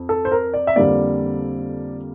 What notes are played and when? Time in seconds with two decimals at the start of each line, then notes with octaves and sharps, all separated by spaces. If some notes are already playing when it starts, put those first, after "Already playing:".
Already playing: F2
0.09 A4
0.25 C5
0.32 A#4
0.54 D5
0.67 E5
0.76 F2 D3 G3 A#3 D5